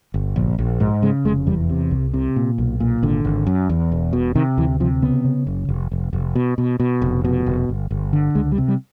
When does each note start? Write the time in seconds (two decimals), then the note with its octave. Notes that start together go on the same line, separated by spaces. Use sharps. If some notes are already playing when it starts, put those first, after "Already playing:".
0.14 G1
0.36 A#1
0.59 A#1
0.80 G#2
1.02 C#3 G#3
1.25 F1 G#3
1.47 E2 G3
1.69 C3
1.91 C2
2.14 C3
2.36 A#2
2.58 B1
2.80 A#2
3.02 G#1 D3
3.25 G#1
3.47 F#2
3.69 E2
3.92 E1
4.13 B2
4.35 C3 D#3
4.58 D2 E3
4.80 C3 F3
5.02 C#3 B3
5.25 C#3
5.47 F#1
5.69 F1
5.92 F1
6.13 F1
6.35 B2
6.58 B2
6.80 B2
7.02 F1
7.25 B2
7.46 F1
7.69 G1
7.91 G1
8.13 D3
8.35 C#2 G#3
8.52 G3
8.58 C3
8.68 G3